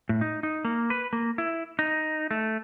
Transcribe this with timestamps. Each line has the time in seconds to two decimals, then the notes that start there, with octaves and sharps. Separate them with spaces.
0.09 A2
0.21 D#4
0.43 D#4
0.65 A#3
0.90 B4
1.13 A#3
1.38 E4
1.79 D#4
2.31 A3